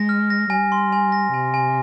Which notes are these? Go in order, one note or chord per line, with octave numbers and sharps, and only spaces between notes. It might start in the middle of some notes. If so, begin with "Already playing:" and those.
Already playing: G#3 A#6
F6
A#6
G3 G#5
C6
G#5
A#6
C3 G#5
G#5